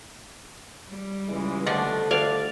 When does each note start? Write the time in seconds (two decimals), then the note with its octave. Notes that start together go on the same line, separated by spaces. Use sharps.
0.88 G3
1.28 C#2 E3 G#3
1.66 B2 D3 F3 A3 D4
2.11 D5 F5